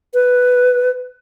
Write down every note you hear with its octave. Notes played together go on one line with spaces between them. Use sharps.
B4